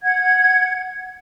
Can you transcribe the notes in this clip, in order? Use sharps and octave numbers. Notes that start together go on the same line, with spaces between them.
F#5 G#6